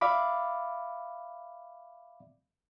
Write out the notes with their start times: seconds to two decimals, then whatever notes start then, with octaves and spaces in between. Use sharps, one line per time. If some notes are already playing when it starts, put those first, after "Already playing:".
0.01 D5 E5 F5 B5 D6